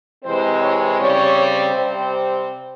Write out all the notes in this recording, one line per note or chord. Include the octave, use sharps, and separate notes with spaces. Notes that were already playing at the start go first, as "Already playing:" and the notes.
C3 E3 G#3 C4 C5
C#5
C#3 G3 C4 C#5
C5
C3 G3 C4